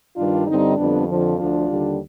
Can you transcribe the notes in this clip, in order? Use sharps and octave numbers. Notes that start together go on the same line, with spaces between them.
G2 D#3 G3 D4 F4
G2 D3 G3 C4 D#4
F2 D3 G3 B3 D4
F2 D3 F3
D2 D3 F3 D4 F4
D#2 D3 G3